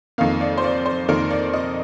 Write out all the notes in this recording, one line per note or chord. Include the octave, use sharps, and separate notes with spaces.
F2 D#3 A#3 F5
D5
C5
D5
C5
F2 D#3 A#3 A#4
D5
D#5